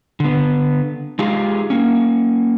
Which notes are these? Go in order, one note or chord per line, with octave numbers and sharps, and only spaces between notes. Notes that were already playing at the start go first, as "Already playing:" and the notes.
D3 B3
G#3 D#4 F4 G4 G#4
A#3 C#4